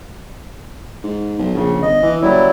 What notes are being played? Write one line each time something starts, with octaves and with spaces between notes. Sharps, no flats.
G#2
B1
A#1 C#3
G1 D#5
E3
F#1 F#3 G3 E4